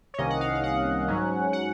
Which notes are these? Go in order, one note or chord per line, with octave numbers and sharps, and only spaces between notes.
C#5
C2 C3 D#3 A#3 C#4 D#5
F#5
F5
F5
F#5
G#2 F#3 C#4
F#5